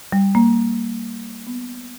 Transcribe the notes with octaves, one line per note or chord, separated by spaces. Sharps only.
G3
A#3
B3